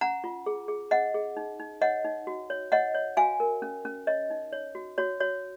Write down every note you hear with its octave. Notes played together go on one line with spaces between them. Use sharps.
C#4 F#5 A#5
F4
G#4
G#4
C#4 D#5 F#5
G#4
D#4
D#4
C#5 D#5 F#5
D#4
F#4
C#5
C#5 D#5 F#5
C#5
F#4 F5 G#5
A#4
C#4
C#4
C#5 D#5
D#4
C#5
F#4
F#4 C#5
F#4 C#5